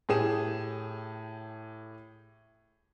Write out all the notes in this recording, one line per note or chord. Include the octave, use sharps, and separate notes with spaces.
A2 G4 G#4 D#6 E7